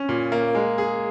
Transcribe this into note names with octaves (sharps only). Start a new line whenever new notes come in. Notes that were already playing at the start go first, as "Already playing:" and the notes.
Already playing: C#4
A#2
A#3
G#3
G#4